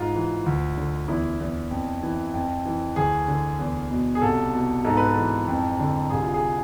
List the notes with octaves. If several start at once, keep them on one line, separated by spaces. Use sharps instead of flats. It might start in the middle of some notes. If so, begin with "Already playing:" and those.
Already playing: G#2 F4
E3
D2
D3
E2 E4
E2
F2
E3
F2
E3
D2 G#4
D3
E2
B2
G#4
C2 A4
B2
G#2 A4
B4
A4
E3
F2
D3
C2 G#4
F4
G#4